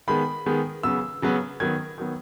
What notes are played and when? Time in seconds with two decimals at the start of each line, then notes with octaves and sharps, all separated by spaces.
0.08 D#3 G#3 B3 B5
0.46 D#3 G#3 B3
0.83 C#3 F#3 B3 E6
1.22 C#3 F#3 B3
1.60 D#3 F#3 B3 G#6
1.98 D#3 F#3 B3